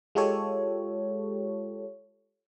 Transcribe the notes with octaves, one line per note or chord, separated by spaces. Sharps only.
G#3 F4 G4 A4 C#5